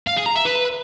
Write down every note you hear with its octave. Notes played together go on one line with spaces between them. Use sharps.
F5
G#4
A#5
E5
B4